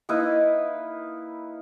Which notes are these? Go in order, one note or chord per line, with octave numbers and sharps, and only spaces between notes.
A#3 D#4 E4 B4